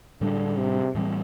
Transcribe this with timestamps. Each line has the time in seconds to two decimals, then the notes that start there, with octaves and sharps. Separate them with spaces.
0.21 A2 D3 G3 D4
0.57 C3
0.95 A2 E3 G3 C4